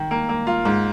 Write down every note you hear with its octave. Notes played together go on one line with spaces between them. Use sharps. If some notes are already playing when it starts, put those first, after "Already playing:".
Already playing: D#3
A#3
A#3
F4
G#2